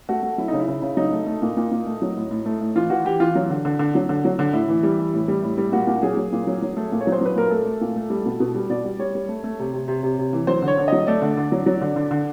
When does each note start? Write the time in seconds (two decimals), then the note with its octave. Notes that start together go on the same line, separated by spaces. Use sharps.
0.09 A3 F#4
0.23 A3
0.38 F#3 E4
0.48 C#3 D#4
0.60 E4
0.68 C#3
0.82 C#3
0.97 F#3 D#4
1.12 A3
1.26 A3
1.42 A#2
1.57 A#2
1.71 A#2
1.87 A3
2.02 F#3
2.17 A2
2.31 A2
2.46 A3
2.60 A2
2.75 E3 F4
2.90 E3 F#4
3.05 E3 G4
3.20 E3 F4
3.35 F#3
3.50 D3
3.65 D3
3.79 D3
3.95 F#3
4.09 D3
4.25 F#3
4.39 D3
4.53 A2 E4
4.68 E3
4.83 G3
4.99 E3
5.13 A2
5.28 G3
5.43 A2
5.58 G3
5.72 A#2 F#4
5.87 A#2
6.02 F#3 G#4
6.17 F#3
6.32 A#2
6.47 F#3
6.62 F#3
6.77 A3
6.92 A#2
7.01 C#5
7.07 F#3
7.12 C5
7.21 F#3 B4
7.35 A#2 A#4
7.50 A3 A4
7.65 A3
7.81 A#2
7.96 A3
8.10 G3
8.26 B2
8.40 B2
8.55 G3
8.70 B2 D5
8.84 G3
8.99 G3 C#5
9.15 G3
9.29 A3
9.44 A3
9.59 C3
9.73 C3
9.88 C3
10.03 C3
10.18 C3
10.33 E3
10.47 F#3 C5
10.62 D3
10.68 C#5
10.78 D3
10.88 F#3 D#5
11.07 A3 D5
11.22 D3
11.37 D3
11.52 F#3
11.66 F#3
11.81 D3
11.96 D3
12.11 D3